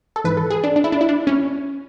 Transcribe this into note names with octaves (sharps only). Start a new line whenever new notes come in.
A4
G#2 E3 B4
A4
G#4
D4
D4
E4
D4
E4
D4
C#4